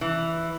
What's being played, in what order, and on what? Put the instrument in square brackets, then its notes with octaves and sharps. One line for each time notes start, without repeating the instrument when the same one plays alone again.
[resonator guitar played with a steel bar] E3